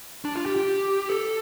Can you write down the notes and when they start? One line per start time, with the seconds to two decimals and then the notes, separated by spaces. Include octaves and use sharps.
0.25 D4
0.36 F4
0.46 G4
0.56 G4
1.09 A4